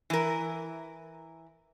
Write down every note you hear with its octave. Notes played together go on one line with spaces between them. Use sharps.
E3 A#4